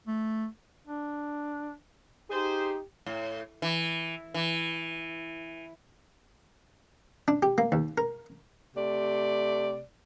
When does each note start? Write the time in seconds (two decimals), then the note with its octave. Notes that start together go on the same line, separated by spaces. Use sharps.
0.07 A3
0.87 D4
2.30 D#4 G4 G#4 C5
3.06 A2
3.62 E3
4.34 E3
7.28 D4
7.43 G4
7.58 A#3
7.72 D#2
7.98 A#4
8.76 C3 A3 D5